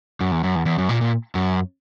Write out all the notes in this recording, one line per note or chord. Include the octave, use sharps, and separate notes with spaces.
F#2
E2
F#2
E2
E2
F#2
A#2
A#2
F#2